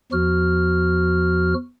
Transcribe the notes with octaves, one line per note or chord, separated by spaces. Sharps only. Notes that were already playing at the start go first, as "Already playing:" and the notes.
E2 F3 F#4 F6